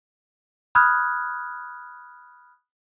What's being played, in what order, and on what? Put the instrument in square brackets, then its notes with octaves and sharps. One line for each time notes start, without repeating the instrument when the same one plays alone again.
[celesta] B5 D#6 F6 F#6 G#6